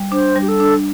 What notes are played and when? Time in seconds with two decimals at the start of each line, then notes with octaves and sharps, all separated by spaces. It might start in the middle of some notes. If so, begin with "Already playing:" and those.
Already playing: G3
0.12 D4 C5
0.36 G3
0.42 G4
0.48 A4
0.60 D4